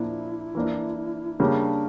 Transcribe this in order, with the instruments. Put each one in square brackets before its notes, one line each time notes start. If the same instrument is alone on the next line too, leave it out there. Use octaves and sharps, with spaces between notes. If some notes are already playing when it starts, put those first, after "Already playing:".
Already playing: [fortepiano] A#2 F3 A#3 D4 [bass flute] E4
[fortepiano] E3 A#3 D4
[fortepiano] C#3 G3 A#3 [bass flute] D4